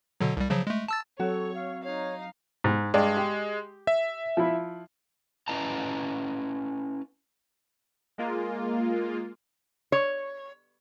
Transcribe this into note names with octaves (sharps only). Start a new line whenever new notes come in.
B2 D3 F#3
C2 G3
C#3 F3 F#3
G#3 A3
A5 E6 A6
F#3 C4 F#4 A4 C#5
F5
D#4 C#5 F5
G#2
G2 G#3 D5
G4
E5
F3 E4
C#4 E4 B4 D#5 A5 A#5
G#3 A#3 F4
C#5